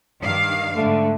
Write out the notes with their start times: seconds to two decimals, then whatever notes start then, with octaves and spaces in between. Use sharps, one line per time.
0.20 G2 D#3 F5
0.76 G#2 D3 A3